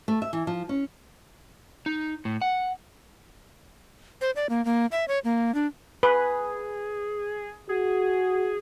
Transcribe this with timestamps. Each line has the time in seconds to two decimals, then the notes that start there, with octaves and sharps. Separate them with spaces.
0.08 A3
0.22 E5
0.33 E3
0.47 F3
0.69 C#4
1.86 D#4
2.25 A2
2.42 F#5
4.21 C5
4.36 D5
4.49 A#3
4.65 A#3
4.92 E5
5.08 C#5
5.24 A#3
5.55 D4
6.03 G#4 B4
7.69 F#4 G#4